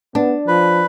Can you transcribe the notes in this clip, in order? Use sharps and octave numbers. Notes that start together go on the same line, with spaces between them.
B3 D4
F3 B4